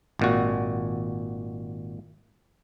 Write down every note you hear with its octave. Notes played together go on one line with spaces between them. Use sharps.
G#1 A#2 F#4